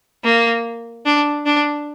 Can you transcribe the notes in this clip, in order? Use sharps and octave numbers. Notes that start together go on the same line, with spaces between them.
A#3
D4
D4